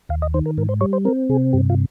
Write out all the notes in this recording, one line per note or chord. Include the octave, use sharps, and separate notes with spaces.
D#2 F5
D#5
D#3 C5
A#4
G#2 A#4
C5
G3 C#5
C5
C4 A#4
C3 G#4
G2 G4
F4